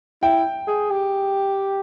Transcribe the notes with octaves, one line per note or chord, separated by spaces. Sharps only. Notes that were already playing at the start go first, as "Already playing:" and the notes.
E4 G5
G#4
G4